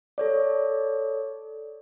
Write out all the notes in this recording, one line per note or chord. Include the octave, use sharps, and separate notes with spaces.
A4 C#5 D5